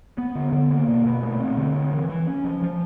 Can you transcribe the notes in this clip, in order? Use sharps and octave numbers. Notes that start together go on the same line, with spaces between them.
B3
D3
D3
A#3
B2
B2
A3
C4
D3
C4
E3
E3
C#4
F3
F3